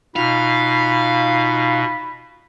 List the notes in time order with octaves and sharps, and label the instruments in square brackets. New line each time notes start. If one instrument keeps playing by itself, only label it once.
[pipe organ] B2 [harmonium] D#4 F4 [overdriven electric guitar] F5 [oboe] B5